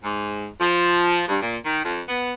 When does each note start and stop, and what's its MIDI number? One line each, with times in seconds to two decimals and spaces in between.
0.04 0.46 44
0.60 1.22 53
1.27 1.38 43
1.41 1.56 46
1.65 1.81 51
1.84 2.00 41
2.08 2.32 59